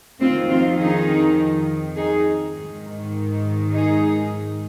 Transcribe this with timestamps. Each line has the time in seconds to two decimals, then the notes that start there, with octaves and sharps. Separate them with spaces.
0.21 F2 D#3 C4 F4
0.50 C4 F4
0.79 D#4 G#4
1.96 D#4 G#4
2.54 G#2 D#3
3.71 D#4 G#4